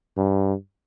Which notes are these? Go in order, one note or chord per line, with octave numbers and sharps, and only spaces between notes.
G2